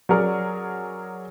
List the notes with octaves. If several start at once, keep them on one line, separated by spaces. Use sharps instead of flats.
F#3 C#4 G#4 A#4 D5